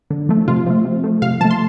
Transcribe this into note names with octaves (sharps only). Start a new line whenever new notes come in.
D3
F3 A3
C3 F4
F3 A3
C3
F3 A3
C3 F5
F3 A3 A5
C6